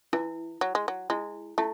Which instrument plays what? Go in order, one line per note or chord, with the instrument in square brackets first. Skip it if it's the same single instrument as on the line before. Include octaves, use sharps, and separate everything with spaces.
[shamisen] E3 [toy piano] E4
[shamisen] F#3
G#3
F#3
[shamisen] G#3 [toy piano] E4
[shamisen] A3 [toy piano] E4